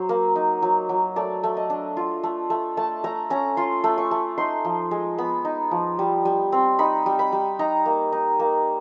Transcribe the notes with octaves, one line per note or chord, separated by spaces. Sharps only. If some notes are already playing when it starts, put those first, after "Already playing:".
Already playing: F#3 C5
A#3
D#4
F#3
F#3
A3 D5
A3
D#5
D4
F4
A3
A3
A3 A5
A3 A#5
C#4 A#5
F4 C6
A3
C#6
A3
D#4 C6
F3
G#3
B3 B5
D#4
F3
G3
G3
C4
D#4 B5
G3
B5
G3
D#4 A#5
A#3
D#4
A#3